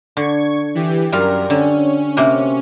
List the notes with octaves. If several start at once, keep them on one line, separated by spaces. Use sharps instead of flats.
D3 C#6 G#6
E3 G4
F#2 G3 F4 A#4 F5
D3 C#4
C3 A#3 F#4